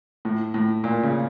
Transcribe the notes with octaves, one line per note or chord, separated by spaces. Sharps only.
A2
A2
A#2
C#3